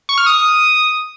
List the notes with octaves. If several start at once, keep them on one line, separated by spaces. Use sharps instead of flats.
C#6
F6
D#6